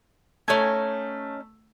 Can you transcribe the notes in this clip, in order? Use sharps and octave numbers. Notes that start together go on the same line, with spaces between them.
A3 C#4 D#4 G#5